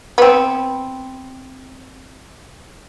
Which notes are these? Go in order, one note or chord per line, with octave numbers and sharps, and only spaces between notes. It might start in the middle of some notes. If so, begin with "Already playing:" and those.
B3 C4